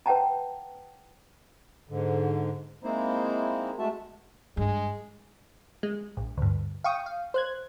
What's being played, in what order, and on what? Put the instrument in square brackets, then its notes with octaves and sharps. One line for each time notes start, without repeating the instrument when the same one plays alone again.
[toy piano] B4 C#5 F#5 G5 A5 A#5
[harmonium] G#2 D3
G#3 A#3 C4 D#4 E4 C5
G#3 A3 F#4 E5 A5
[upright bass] G2 [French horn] G#3
[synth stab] G#3
A#1
D2 G2
F5 G5 C#6 D#6
F5
C5 F#6 G#6